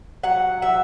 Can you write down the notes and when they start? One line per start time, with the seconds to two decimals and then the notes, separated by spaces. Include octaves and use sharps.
0.23 F#3 F#5
0.62 F#3 E5